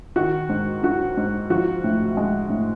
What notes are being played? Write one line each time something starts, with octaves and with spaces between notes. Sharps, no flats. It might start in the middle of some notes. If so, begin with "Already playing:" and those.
D#3 F#4
G#2
F#3 F#4
G#2
F3 F#4
A2
G#3
A2